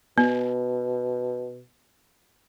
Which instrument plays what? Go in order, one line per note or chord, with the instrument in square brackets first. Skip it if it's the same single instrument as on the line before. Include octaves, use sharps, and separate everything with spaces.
[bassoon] B2 [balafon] B3